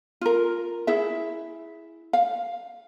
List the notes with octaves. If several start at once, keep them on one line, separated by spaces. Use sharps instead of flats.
F4 A#4
E4 G#4 E5
F5